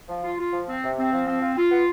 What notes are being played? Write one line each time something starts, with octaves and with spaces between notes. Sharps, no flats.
F3
F4
F4
F3
C4
C3
C4
F3
C4
F4
F4
B3